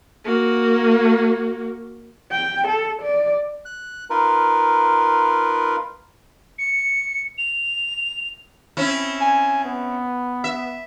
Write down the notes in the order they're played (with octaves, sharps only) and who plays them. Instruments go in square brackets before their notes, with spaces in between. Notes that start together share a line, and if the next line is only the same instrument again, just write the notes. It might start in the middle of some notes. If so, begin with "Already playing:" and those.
[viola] A#3 F#4
[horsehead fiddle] G5
A4
D5
[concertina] F#6
D#4 F4 A#4 B4
[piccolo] C#7
F7
[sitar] C4 C#4 E4
[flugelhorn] G#5
B3
[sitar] E5